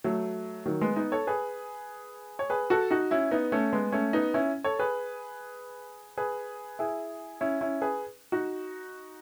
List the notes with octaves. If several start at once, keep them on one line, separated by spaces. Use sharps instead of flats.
F#3 A3
D#3 F#3
G#3 B3
B3 D#4
A4 C#5
G#4 B4
C#5
G#4 B4
F#4 A4
D#4 F#4
C#4 E4
B3 D#4
A3 C#4
G#3 B3
A3 C#4
B3 D#4
C#4 E4
A4 C#5
G#4 B4
G#4 B4
E4 G#4
C#4 E4
C#4 E4
G#4 B4
D#4 F#4